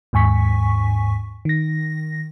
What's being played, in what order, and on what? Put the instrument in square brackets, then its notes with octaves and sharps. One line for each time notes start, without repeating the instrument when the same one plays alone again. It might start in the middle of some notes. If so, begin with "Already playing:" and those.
[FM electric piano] D#2 G#2 G#5 C#6 B6
D#3 A#6